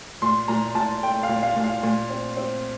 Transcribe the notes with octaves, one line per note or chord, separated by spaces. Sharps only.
A#2 C6
A#2 A#5
A#2 A5
A3 G5
F5
A#2
F5
A#2
F5
A#2
C4
C4